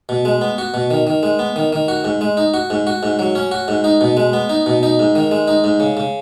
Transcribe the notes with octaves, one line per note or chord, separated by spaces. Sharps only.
B2
G#3
B3
F#4
B2
D#3
D#3
G#3
B3
D#3
D#3
F#4
G#2
G#3
D#4
F#4
G#2
F#4
G#2
F#3
C#4
F#4
G#2
D#4
B2
G#3
B3
D#4
B2
D#4
G#2
D#3
G#3
D#4
G#2
C#3
C#3